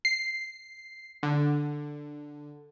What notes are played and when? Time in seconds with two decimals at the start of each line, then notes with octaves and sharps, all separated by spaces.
0.05 C7
1.23 D3